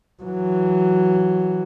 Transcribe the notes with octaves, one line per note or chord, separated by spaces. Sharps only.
E3 F#3